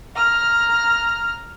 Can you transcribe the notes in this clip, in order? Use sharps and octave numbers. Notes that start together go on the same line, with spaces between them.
A#5 F6